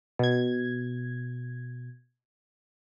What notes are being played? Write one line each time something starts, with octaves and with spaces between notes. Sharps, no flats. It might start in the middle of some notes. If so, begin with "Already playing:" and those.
B2 G#6